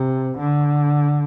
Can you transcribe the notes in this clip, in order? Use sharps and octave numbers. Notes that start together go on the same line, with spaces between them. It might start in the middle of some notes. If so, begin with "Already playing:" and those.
Already playing: C3
D3